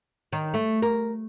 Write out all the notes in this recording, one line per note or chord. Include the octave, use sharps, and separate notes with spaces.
D#3
A3
A#4